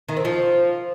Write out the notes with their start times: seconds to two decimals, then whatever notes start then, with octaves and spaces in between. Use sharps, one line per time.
0.08 D#3
0.17 C4
0.25 F3